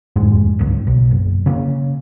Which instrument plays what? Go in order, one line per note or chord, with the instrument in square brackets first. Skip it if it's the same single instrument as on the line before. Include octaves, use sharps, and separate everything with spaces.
[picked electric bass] F1 D#2 G#2 G#3
G1 C#2
B1
F#1
C#3 A#3 C4 C#4